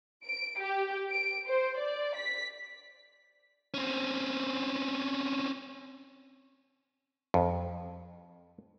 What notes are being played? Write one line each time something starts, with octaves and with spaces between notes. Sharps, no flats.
D7
G4
D7
C5
D5
B6
C4 C#4
F2